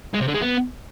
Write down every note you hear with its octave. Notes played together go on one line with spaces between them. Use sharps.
G#3
C3
D3
G#3
B3